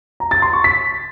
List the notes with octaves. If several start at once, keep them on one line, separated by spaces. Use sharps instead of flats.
A#5
A6
C6
C#6
B6